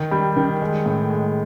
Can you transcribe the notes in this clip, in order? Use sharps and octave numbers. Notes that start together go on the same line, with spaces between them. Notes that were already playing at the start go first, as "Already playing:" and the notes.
Already playing: D#3
G3
D#3
G#3
A2
G#3